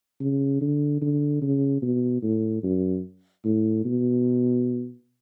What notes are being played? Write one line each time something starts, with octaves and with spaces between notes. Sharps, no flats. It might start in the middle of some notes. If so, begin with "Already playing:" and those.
C#3
D3
D3
C#3
B2
A2
F#2
A2
B2